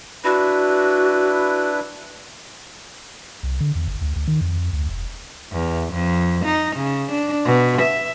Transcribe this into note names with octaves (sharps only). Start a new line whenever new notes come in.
D4 E4 F#4 B4
C2
D3
E2
G1
D2
D2
D#3
F2
D2
E1
E2
F2
D#4
C#3
D4
B2
E5